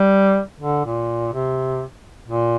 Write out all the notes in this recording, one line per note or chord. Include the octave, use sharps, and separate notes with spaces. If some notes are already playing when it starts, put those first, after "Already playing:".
Already playing: G3
D3
A#2
C3
A#2